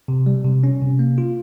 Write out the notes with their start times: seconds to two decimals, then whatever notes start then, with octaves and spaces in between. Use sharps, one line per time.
0.08 C3
0.26 G3
0.45 C3
0.64 C#4
0.81 C3
0.99 A#3
1.18 F4